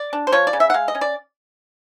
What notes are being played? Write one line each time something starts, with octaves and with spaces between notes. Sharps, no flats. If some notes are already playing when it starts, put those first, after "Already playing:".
Already playing: D5
D4
C5
F3 C#5
D5
C#3
E5
F#5
G#3 F5
D#5
C#4
D5